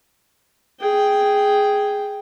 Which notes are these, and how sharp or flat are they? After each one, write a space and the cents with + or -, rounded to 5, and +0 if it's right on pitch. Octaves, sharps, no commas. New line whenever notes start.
G#4 +0 G5 +0